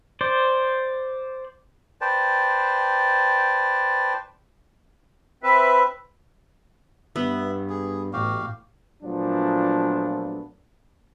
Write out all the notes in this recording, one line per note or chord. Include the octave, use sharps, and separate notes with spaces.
C5 D5
B4 C5 D5 G5 A5
C4 B4 E5
G2 B3 E5
G#4
A1 A2 F#4 G4 F5
A#2 F3 F#3 A3 B3 D4